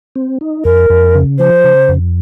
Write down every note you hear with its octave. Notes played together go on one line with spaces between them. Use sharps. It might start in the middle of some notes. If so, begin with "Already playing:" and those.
C4
D#4
F2 A#4
F2
C#3
F3 C5
C#3
F2